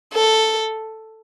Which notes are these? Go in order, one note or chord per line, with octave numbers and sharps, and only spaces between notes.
A4